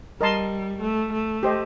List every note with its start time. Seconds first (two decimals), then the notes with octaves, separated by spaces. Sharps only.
0.21 G3 A#4 D#5 A5 C6
0.82 A3
1.13 A3
1.43 G4 C5 D#5